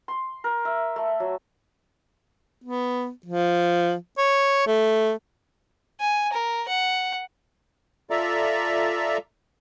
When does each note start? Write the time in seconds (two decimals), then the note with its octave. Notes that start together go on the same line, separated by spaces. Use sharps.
0.08 C6
0.44 A#4
0.65 E5
0.96 A3
1.20 F#3
2.64 B3
3.26 F3
4.18 C#5
4.67 A3
6.00 G#5
6.33 A#4
6.68 F#5
8.10 F4 A4 D5 E5 A#5